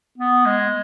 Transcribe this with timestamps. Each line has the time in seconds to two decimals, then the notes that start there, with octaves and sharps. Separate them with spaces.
0.18 B3
0.45 G#3